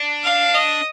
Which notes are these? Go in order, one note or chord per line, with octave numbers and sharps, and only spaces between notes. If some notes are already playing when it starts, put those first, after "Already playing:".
Already playing: D4
F5
D#5